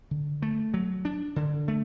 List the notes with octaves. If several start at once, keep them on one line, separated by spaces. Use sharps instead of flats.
D3
A3
F#3
D4
D3
A3